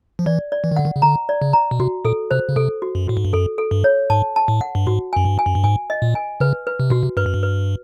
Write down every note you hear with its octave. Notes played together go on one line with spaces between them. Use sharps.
F3
E3 D5
D5
E3
D#3
D3 F#5
D#3
C#3
D3 A#5
D5
C#3
A#5
B2
C3 F#4
A#2 A4
C3 C5
C#3
C3 A4
F#4
F#2
A2 F#4
G#2
G2
F#2 A4
A4
G2
C#5
G#2 A5
A5
A2
F#5
G2
G#2 F#4
F#2 G#5
G2
G#5
F#2
G2
G#2 G#5
D#5
A#2
G#5
C#3 B4
B4
C3
B2 F#4
C3
G2 B4
F#2
G2
B4